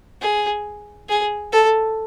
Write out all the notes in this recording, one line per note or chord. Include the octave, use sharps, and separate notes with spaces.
G#4
G#4
A4